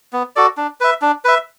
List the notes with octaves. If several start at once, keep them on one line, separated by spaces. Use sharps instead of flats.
B3
F#4 A4 D5
D4
B4 E5
D4
B4 E5